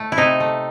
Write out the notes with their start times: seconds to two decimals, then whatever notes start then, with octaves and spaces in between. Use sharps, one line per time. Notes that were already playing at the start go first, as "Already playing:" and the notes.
Already playing: A2 A3
0.12 E4
0.17 C3 D#4
0.40 A3